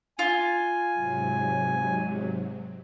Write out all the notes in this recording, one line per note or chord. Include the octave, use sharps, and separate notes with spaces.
F4 G#5
G#2 C3 F#3